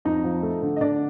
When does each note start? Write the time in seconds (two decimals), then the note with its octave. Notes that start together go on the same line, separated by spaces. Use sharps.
0.05 F2 D#4 D#5
0.24 F3
0.43 A3
0.62 D3
0.76 D#5
0.81 D3 D4 D5